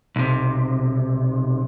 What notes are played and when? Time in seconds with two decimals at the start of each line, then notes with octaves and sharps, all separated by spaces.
0.16 B1 C3